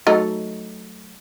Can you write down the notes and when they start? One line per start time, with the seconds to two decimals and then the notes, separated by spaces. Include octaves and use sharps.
0.07 F#3 A3 D#4